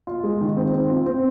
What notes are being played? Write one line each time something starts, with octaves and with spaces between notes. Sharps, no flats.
F4
G#3
D#3
C4
C4
F4
C4